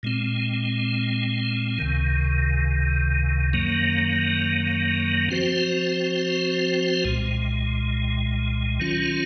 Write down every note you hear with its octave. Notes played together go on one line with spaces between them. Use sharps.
A#2 G#3 C4
C#2 C3 D#3
F#2 D#3 F#3 A#3
F3 C4 F#4 C5
C2 A#2 G#3
D#3 F#3 C#4 F4